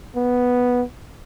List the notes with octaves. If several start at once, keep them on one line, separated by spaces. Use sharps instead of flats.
B3